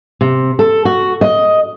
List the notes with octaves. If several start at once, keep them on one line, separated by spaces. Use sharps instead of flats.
C3
A4
F#4
D#5